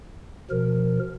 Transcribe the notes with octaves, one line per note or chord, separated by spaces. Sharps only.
B2 F3 A#4